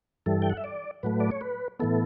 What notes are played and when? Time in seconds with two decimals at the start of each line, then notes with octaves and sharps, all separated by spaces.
0.26 G2 E3 G3 A4
0.42 G5
0.50 F#5
0.57 E5
0.64 D5
1.03 A2 F#3 A3 B4
1.20 D5
1.31 C#5
1.41 B4
1.80 A2 E3 B3 A4